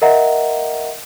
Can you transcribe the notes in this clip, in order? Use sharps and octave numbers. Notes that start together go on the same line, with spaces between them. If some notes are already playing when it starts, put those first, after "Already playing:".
A#4 D#5 E5 F#5 A#5